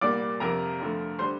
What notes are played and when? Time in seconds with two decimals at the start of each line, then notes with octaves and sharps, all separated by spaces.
0.01 C2 A#2 G3 A#3 D5 D6
0.40 F2 C3 F3 A#4 A#5
0.80 F2 D3 F3 A3
1.19 D3 G3 C5 C6